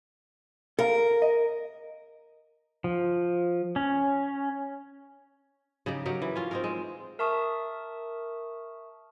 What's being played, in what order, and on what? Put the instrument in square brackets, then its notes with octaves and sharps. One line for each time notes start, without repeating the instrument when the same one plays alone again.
[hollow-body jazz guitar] A4 F5 A#5 [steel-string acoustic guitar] A#4
[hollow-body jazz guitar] D#5
[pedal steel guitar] F3
C#4
[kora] C#3 D#4 G4
F#3 D#4 G4 A#4
E3
C#4 F4
C4 D#4 A#4
G#3
[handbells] A#4 E5 A5 C#6 D#6